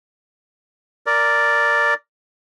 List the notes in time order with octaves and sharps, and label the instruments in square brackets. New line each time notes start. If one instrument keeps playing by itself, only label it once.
[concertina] A#4 D5